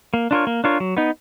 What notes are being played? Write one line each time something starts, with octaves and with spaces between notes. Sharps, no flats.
A#3
D4 F4 A#4 C#5
A#3
D4 F4 A#4 C#5
F#3
B3 D#4